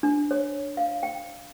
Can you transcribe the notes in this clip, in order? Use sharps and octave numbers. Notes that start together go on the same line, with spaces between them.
D4
C#5
F5
G5